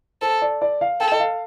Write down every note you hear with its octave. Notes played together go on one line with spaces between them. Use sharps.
A4 C5
D5
D5
F5
A4 G5
D#5
F5